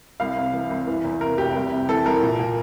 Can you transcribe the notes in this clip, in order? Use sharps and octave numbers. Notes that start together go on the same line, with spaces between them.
C2 F5
C3
E3
C2
E3
E2
C3 A#4
F1 G4
C2
C3
E3 A4
C2 A#4
A#2
A#2